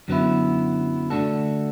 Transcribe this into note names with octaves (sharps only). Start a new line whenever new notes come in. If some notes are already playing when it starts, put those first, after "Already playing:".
F#2 D3 F#3 B3 E4
D3 A3 D4 F#4 A4